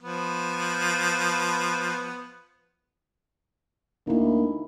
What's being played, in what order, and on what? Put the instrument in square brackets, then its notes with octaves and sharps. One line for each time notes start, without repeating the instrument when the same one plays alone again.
[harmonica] F3 B3
[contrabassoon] D2 [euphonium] A#3 [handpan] D#4 E4